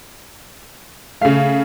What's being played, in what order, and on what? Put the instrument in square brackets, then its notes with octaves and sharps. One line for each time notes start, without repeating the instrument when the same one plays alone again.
[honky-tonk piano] C#3 A3 [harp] F5